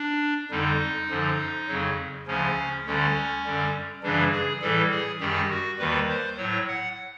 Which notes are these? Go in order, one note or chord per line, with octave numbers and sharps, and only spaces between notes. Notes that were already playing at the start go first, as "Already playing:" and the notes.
Already playing: D4
F2 D3 G3 D#4
F#2 D3 F3
F2 C#3 F#3
D2 C#3 F3 C#4
D2 D3 G3 C#4
F#2 D3 G3
F#2 C#3 E3 G3 D4
G#4
A2 E3 G3 A4
G#4
F#2 D#3 G3 G4
F#4
D#2 D#3 G3 B4
C5
A2 F#3 C#5
F#5